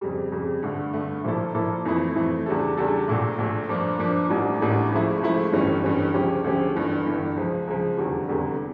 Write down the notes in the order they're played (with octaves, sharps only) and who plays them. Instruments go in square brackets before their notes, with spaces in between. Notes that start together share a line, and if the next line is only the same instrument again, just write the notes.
[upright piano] F2 C#3 G3
F2 C#3 G3
G2 D3 A3
G2 D3 A3
A#2 F3 A#3 E4 A4
A#2 F3 A#3 E4 A4
F2 E3 A3 E4
F2 E3 A3 E4
E2 C#3 G3 D4 A4
E2 C#3 G3 D4 A4
A#1 A#2 A3
A#1 A#2 A3
G2 F3 A#3 D4
G2 F3 A#3 D4
A1 A2 G3 A#3 D4
A1 A2 G3 A#3 D4
C#2 C#3 F3 A3 E4
C#2 C#3 F3 A3 E4
G1 G2 E3 G3 C#4
G1 G2 E3 G3 C#4
D2 C#3 F3 C#4 G4
D2 C#3 F3 C#4 G4
G1 G2 E3
G1 G2 E3
C#2 C#3 F3
C#2 C#3 F3
F1 E2 D3 G3
F1 E2 D3 G3